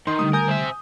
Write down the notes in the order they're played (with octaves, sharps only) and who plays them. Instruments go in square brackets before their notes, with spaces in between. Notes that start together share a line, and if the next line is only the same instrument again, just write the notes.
[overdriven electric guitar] D#3 [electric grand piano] C6
[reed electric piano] D3 G3 A3 [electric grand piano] D#6
[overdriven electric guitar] A#4 [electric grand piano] G#5 D#6 G6
[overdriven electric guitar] C4 E5